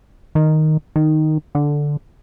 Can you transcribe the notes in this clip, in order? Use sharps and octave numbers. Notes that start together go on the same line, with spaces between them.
D#3
D#3
D3